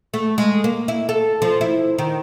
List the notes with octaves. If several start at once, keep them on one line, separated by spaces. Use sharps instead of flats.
A3
G#3
A#3
E4
A4
F3
E4
D#3